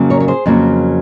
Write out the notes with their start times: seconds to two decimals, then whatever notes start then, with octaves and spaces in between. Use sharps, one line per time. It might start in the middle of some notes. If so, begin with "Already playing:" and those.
Already playing: F2 C#3 F#3 A#3
0.10 A#4 C#5
0.20 C#5
0.28 G#4 C5
0.46 F2 C#3 F#3 A#3